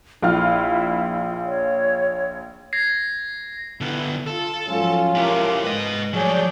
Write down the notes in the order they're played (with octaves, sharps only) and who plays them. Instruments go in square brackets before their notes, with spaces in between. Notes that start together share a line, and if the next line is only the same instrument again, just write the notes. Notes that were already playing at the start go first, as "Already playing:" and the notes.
[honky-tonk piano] A#1 F4 F6 [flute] E4
[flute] C#5
[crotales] G#6 A#6 C7
[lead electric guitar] D3 B3 [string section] E4
[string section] F4 [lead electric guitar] A4
[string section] G#2 F3 F#3 [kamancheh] C#4 F4
[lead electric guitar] E4 G4 [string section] A4 A#4 D6
[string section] G#2 [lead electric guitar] B4 D#5
[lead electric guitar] F3 F#3 [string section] A3 D5 G6 [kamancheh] G#4 C#5